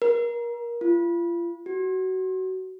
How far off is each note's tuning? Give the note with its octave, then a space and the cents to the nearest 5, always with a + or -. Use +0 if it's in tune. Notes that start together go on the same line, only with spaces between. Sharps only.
A#4 +25
F4 -35
F#4 +20